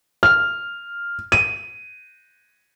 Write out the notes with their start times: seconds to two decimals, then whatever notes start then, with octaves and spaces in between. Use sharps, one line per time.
0.23 F6
1.32 D#7